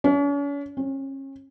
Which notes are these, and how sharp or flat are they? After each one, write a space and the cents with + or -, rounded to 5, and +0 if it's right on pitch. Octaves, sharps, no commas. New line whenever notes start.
C#4 +40
C#4 -35